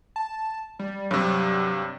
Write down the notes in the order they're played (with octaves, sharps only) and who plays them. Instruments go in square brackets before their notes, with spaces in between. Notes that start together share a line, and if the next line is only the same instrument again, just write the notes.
[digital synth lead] A5
G3
[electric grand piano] G2 C3 [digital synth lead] F#3